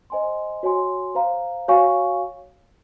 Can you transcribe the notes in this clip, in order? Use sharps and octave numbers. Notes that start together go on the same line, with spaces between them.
C5 D#5 G#5 C6
F#4 C#5 G#5 C6
C5 F5 A#5
F#4 C#5 F5 G#5 C#6